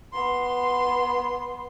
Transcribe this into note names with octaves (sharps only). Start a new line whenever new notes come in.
B3 C6